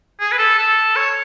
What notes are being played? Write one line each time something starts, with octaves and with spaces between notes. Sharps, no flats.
G#4
B4
A4
A4
C#5